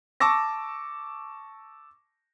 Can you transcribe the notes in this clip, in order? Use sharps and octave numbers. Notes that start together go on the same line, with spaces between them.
A5 C#6 D6 E6 A#6